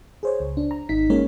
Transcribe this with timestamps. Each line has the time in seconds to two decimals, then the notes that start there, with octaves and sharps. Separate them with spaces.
0.23 G#4 C5 C#5
0.40 C#2
0.57 D4
0.71 A#5
0.89 G#1 D#4 B6
1.10 G#3 A#3 C#4 A#4 C#5